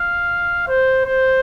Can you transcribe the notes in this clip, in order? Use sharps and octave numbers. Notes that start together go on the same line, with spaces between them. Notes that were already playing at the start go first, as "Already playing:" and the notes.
Already playing: F5
C5
C5